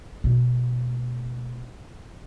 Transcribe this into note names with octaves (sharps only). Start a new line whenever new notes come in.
B2 A3